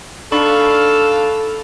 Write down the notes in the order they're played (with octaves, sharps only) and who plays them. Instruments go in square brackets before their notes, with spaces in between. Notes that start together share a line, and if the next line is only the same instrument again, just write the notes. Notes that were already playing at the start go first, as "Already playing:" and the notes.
[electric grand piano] D4 [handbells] D#4 B5 C#6 [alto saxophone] A4 [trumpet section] F5